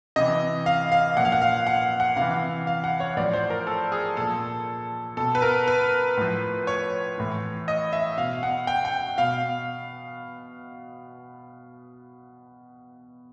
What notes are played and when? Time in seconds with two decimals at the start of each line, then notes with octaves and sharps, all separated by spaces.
0.16 C3 E3 D#5
0.66 F5
0.92 F5
1.16 A#2 F3 F#5
1.25 F5
1.32 F#5
1.42 F5
1.67 F#5
2.00 F#5
2.17 C3 E3 F5
2.67 F5
2.84 F#5
3.00 C#5
3.17 A2 F3 D5
3.34 C5
3.50 A#4
3.67 A4
3.92 G#4
4.17 A#2 F3 A4
5.17 B2 A4
5.35 B4
5.42 A#4
5.68 B4
6.17 A2 F3
6.67 C#5
7.18 A2 E3
7.68 D#5
7.93 E5
8.18 B2 F5
8.43 F#5
8.67 G5
8.85 G5
9.18 B2 F5